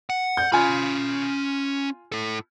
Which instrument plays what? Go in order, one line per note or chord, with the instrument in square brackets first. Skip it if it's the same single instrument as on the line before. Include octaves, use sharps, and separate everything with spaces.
[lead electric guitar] F#5
[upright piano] G6
[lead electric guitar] C#4 B5 [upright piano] F4 G#5
[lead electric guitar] E4 A4